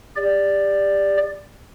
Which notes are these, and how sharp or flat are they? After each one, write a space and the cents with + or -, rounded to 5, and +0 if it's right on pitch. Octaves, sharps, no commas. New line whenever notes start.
G4 +30 D5 +0